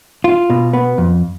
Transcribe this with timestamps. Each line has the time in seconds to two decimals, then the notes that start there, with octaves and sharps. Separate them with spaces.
0.24 F4
0.50 B2
0.73 B3
0.98 F2